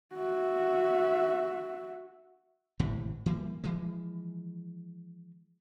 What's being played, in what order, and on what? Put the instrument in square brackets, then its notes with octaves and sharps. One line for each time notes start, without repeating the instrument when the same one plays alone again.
[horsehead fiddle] F#4 E5
[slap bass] G#1 A2 C3 E3
E3 G3 A#3
E3 F3 G#3